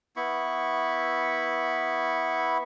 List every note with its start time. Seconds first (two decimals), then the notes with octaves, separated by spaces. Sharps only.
0.16 B3 E4 B5 C#6